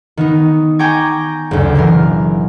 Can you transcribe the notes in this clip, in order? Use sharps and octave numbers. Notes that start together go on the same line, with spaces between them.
D#3 B3 D#4
G5 G#5 A#5 C#6 D6 G#6
F#1 D2
B2 E3 A#4